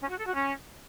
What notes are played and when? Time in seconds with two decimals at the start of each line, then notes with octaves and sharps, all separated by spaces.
0.01 C#4
0.09 F#4
0.18 A4
0.26 F#4
0.35 C#4